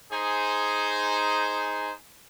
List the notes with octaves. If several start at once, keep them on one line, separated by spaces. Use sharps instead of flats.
D#4 G#4 C5